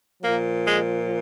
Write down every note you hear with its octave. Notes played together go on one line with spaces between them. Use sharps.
A#2 F3 A#3
G#3